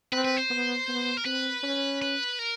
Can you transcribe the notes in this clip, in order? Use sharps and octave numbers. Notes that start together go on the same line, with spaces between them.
C4 B4
B4
C5
B3
B3
A#4
C4 B4
C#4
B4
A#4